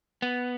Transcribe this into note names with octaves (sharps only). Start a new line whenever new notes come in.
B3